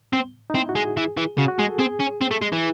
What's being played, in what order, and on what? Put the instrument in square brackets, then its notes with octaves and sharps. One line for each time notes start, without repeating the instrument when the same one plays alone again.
[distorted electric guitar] C4
[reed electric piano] D#4
[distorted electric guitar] C4 [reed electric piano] E4
[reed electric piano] F#4
[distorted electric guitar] G#3
[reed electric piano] G#4
[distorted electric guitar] E3
E3
[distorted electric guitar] C#3 [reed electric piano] F#4
[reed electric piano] F#4
[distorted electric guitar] G#3 [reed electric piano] G#4
[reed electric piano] A4
[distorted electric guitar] C4 [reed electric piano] G#4
[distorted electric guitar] C#4
C4
A3
G#3
E3